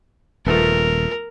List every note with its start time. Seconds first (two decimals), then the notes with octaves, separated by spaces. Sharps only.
0.46 D#1 F3 A3 B3 A#4